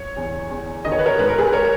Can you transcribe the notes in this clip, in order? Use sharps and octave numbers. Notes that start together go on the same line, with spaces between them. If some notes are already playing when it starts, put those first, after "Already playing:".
Already playing: C#5
E2
E2
D#3 D#5
C#5
B4
A#4 C#5
G#2 B4
A#4
G#4 B4
A#4 C#5